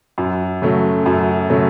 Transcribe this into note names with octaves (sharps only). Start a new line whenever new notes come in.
F#2
C#3 F#3 A3
F#2
C#3 F#3 A3